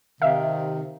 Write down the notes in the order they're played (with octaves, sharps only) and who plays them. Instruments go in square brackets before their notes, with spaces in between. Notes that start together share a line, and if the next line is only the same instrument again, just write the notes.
[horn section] C3 D#3 [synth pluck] E5 F5